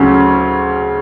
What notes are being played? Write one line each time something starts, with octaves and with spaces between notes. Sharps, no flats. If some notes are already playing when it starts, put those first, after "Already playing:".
Already playing: D2 C#3 F#3 C#4